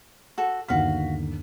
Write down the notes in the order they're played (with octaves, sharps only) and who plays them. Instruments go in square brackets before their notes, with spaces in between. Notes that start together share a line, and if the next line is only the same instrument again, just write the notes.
[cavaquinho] F#4 A4
[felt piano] G1 D#2 B6 [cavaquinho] F#4 F5